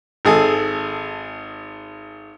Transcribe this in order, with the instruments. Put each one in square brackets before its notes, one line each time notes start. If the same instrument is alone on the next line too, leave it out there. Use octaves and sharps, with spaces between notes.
[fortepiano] G#1 G#4 A4